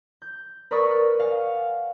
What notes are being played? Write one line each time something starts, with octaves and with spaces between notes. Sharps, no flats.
G6
A#4 B4 D5 C#6 D#6 E6
F#6
F5 F#5 G#5